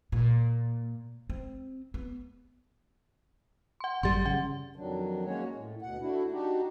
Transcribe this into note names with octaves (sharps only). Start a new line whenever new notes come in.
A#2
C4
B3
F#5 C6
G#1 F#2 G3 C6 A6
C#3 F#5
F2 D#3 F#3 D4
G#3 A#3 C#4 F#4 C#5
A2
D2 B2 F#5
A3 D4 E4 F#4
D4 D#4 F#4 G4